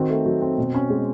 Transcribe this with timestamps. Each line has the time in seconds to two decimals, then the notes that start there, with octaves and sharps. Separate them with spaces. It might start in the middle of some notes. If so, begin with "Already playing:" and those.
Already playing: D#3 C4 F#4
0.10 A3
0.26 F#3
0.42 C4
0.58 B2
0.75 C#4
0.90 G#3